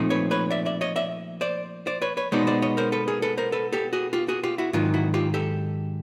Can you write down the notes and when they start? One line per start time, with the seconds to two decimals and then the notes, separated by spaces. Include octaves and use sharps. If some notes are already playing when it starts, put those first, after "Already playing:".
Already playing: A#2 F3 A3 C4 D#4
0.10 B4 C#5
0.31 B4 C#5
0.51 D5 E5
0.66 D5 E5
0.81 C#5 D#5
0.96 D5 E5
1.41 C5 D5
1.87 C5 D5
2.02 B4 C#5
2.17 B4 C#5
2.32 B2 G#3 B3 D#4 C5 D5
2.47 C5 D5
2.62 C#5 D#5
2.77 A#4 C5
2.92 A4 B4
3.08 G#4 A#4
3.22 A4 B4
3.38 A#4 C5
3.52 A4 B4
3.73 G4 A4
3.93 F#4 G#4
4.13 F4 G4
4.28 F#4 G#4
4.43 F4 G4
4.58 E4 F#4
4.73 G#2 D#3 F#3 F4
4.94 E4 F#4
5.14 F4 G4
5.34 G4 A4